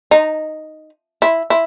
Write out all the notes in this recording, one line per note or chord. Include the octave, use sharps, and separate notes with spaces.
D#4
E4
E4